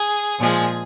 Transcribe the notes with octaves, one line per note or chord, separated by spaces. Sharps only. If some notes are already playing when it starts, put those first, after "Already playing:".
Already playing: G#4
A#2 F3 G#3 G#4